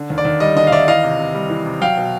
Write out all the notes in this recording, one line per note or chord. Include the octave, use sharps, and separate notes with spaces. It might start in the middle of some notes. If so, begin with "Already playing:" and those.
Already playing: D3
D#2
D5
D#2
G3 D#5
D3 D#5
F5
D#2 D5 E5
E3 D#5 F5
C3
C3
G3
E3
C3
F#3 F5 G5
B2